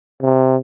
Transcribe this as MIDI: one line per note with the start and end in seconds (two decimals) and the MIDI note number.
0.22 0.57 48